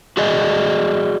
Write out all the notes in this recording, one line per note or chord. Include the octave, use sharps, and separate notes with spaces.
F#4 G#4 D5 D#5